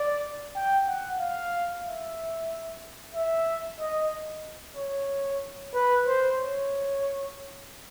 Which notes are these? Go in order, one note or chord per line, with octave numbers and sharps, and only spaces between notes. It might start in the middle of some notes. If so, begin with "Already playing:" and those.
Already playing: D5
G5
F#5
F5
E5
E5
D#5
C#5
B4
C5
C#5